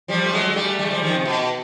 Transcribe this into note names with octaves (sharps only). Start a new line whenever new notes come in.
F3 G3
A3
F#3 G#3
G#3
G3 A3
G3 A3
G#3
F3 G3
D#3 F3
C3
B2